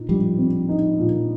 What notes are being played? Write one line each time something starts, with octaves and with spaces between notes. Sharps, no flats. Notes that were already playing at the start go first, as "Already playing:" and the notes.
Already playing: A#2 D#4
F3 G3
C4
D#4
A#2